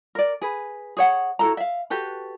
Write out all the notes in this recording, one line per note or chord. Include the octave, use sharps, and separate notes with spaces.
A#4 D5
G#4 B4
G#4 C#5 F#5
E4 F#4 A4 A#5
E5 F5
F#4 G4 A4 B4